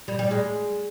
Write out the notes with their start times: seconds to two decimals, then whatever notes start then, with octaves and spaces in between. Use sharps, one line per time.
0.08 G3
0.19 G3
0.31 G#3